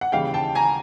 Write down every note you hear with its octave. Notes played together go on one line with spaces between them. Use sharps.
F#5
D#2 C#3 E3 G3 F5 G5
G5 A5
G#5 A#5